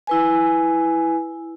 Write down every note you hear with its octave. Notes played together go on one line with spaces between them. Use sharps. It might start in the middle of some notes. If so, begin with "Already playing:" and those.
E4 B4 G#5